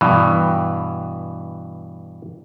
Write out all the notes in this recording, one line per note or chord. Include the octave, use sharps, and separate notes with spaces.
G2 B2 E3